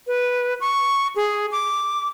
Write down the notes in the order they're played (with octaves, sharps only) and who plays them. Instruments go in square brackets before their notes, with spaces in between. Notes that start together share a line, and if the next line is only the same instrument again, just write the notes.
[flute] B4
C#6
G#4
D6